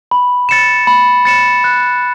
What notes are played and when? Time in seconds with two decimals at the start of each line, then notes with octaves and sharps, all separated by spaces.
0.11 B5
0.49 A6 C#7 E7
0.87 B5
1.25 A6 C#7 E7
1.64 F#6